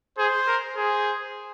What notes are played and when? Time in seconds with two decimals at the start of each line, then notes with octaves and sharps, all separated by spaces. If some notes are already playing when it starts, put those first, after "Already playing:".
0.18 G#4 C5
0.47 A#4
0.77 G#4 C5